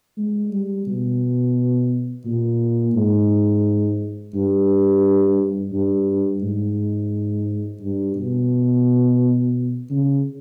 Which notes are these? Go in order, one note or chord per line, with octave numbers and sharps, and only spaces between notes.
G#3
G3
B2
A#2
G#2
G2
G2
G#2
G2
B2
C#3